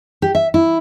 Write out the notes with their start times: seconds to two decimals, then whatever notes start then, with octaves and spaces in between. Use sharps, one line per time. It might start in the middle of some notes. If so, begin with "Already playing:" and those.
0.22 G4
0.35 E5
0.54 E4